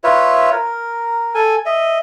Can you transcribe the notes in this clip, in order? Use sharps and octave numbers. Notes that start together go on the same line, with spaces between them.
F4 B4 C#5 E5
A#4
A4 G#5
D#5 E5